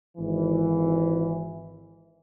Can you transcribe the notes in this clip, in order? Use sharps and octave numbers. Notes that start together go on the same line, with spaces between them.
G#1 E3